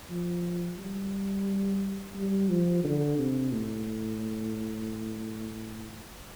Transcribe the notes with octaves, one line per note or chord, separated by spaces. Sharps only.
F3
G3
G3
F3
D3
C3
A2